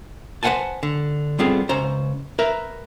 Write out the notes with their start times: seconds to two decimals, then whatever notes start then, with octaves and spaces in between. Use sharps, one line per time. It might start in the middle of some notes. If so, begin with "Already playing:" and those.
0.43 B4 C5 F5 F#5 G#5 A5
0.83 D3
1.39 G3 B3 C4 F4 G#4 A4
1.69 C#2 C#4 C5 A#5
2.39 A#4 B4 E5